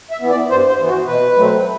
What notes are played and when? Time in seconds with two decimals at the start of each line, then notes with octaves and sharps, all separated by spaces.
0.11 E5
0.21 E3 B3
0.30 D5
0.50 G2 C5
0.69 C5
0.79 E3 B3
0.88 F#4
1.07 B2 B4
1.36 F#3 A3 C4